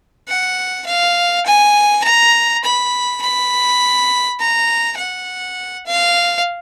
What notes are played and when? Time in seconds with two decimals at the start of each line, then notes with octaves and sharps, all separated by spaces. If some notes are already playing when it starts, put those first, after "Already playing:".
0.28 F#5
0.86 F5
1.46 G#5
2.04 A#5
2.64 B5
3.22 B5
4.40 A#5
4.98 F#5
5.87 F5